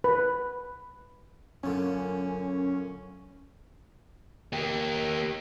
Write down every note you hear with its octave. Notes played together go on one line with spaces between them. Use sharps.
B4
F#2 A#2 D3 C#4
A#3 G4